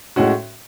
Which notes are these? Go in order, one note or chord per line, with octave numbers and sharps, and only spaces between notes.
A2 G#3 C#4 F#4